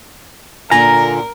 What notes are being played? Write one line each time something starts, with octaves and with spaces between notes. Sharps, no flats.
A#2 D3 F4 A#4 G#5 A#5